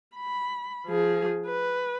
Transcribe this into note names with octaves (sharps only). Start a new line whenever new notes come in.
B5
F3 G#4
B4